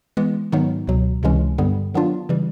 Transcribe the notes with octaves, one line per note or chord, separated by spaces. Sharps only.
E3 G#3 B3
G#2 D#3 F#3 B3 D#4
C#2 B2 F#3
C#2 C3 E3 G#3 C#4
G2 D3 G3 B3
D#3 F#3 B3 D4 F4
C#3 E3 G3